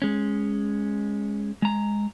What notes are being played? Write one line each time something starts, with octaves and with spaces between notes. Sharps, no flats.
G#3 C#4
G#3 A#5